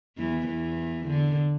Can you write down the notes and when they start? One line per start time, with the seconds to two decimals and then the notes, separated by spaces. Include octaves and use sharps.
0.17 E2 E3
0.46 E2 E3
1.05 D3